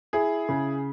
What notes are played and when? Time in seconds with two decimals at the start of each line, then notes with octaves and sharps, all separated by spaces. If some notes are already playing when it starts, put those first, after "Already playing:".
0.13 E4 G#4
0.49 C#3